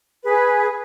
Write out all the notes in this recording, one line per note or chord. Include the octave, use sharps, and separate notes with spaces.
G#4 B4